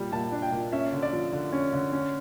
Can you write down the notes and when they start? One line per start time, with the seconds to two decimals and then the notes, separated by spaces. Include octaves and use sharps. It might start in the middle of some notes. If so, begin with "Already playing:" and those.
Already playing: A#2 G3
0.12 A#2 A5
0.32 D4
0.42 G5
0.52 A#2
0.72 C#4 E5
0.92 D3
1.03 D5
1.13 F3
1.33 D3
1.53 C#4
1.73 D3
1.93 C#4